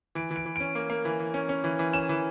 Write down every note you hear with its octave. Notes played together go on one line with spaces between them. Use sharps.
E3 D7
E3
D7
E3
C#4 D7
A#3
A#3
E3
E3
C#4
C#4
E3
E3
C#4 E7
E3